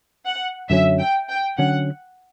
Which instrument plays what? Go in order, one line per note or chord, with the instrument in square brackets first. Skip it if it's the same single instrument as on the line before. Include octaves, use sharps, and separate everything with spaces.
[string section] F#5
[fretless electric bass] F#2 D3 F#3 C#4 [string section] E5
[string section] G5
G5
[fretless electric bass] D3 F#3 C#4 [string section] F#5